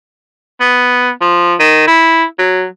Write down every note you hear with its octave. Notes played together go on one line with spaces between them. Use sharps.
B3
F3
D#3
E4
F#3